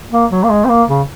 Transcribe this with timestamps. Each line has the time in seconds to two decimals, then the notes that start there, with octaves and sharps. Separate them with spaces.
0.12 A#3
0.31 F#3
0.43 A#3
0.49 G#3
0.65 C4
0.69 A#3
0.89 C#3